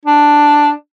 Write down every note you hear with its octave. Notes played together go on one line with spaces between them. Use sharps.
D4